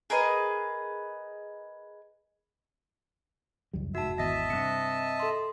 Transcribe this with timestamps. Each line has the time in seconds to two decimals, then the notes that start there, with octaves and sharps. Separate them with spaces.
0.10 G#4 A#4 B4 D#5
3.73 C#2 F#2 G3
3.95 F1 G#2 F#4 E5 A5 E6
4.18 G#1 E2 D#5 E5 A5 A#6 B6
4.50 G2 C3 C4 C#7
5.20 A4 C6